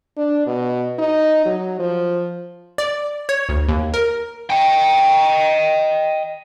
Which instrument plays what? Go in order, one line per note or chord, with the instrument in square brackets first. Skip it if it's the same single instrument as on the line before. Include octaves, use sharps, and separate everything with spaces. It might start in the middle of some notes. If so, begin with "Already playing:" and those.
[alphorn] D4
B2
D#4
F#3
F3
[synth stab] D5
C#5
D2
D#2
A#4
[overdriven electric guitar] D#5 G5